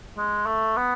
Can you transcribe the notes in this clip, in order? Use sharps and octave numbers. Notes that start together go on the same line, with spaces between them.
G#3
A3
B3